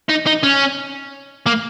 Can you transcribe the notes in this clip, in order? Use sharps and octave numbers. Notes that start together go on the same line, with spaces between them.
D#4
D#4
C#4
A#3